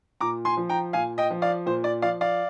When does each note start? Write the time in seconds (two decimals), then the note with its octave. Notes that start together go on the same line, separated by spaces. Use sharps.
0.21 A#2 A#5 D6
0.45 G#5 C6
0.57 F3
0.69 G5 A#5
0.93 A#2 F5 G#5
1.18 D#5 G5
1.30 F3
1.42 D5 F5
1.66 A#2 C5
1.84 D5
2.02 F3 D5 F5
2.21 D5 F5